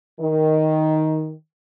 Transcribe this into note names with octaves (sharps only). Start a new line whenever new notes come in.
D#3